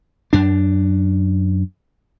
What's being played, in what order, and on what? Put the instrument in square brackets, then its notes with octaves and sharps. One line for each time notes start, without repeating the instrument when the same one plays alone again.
[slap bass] F#2 D4